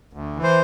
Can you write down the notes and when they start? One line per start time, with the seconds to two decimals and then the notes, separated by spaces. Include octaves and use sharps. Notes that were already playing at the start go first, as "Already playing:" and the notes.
0.13 D2
0.36 E3
0.43 C5